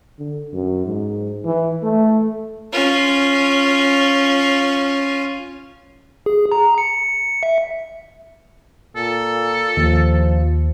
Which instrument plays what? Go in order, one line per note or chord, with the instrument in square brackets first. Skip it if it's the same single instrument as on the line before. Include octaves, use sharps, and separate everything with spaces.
[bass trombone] D3
F#2
G#2
E3
A3
[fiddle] C#4 F4
[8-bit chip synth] G#4
A#5
C#7
E5
[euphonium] A#2 [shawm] A4
[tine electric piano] D#2 [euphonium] F3